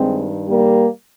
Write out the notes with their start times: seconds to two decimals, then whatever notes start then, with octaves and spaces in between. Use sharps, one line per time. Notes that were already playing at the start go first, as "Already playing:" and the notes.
Already playing: G2 D#3 G#3 C4
0.47 G3 A#3